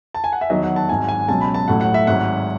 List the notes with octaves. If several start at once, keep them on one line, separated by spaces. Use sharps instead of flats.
A5
G#5
F#5
E5
E2 D#3 F#3 D#5
F#5
A5
G#1 G#2 F#3 G#5
G#5
C#2 B2 F#3 A5
B5
A5
A1 A2 F#3 F#5
F#5
E5
G#1 G#2 F#3 F#5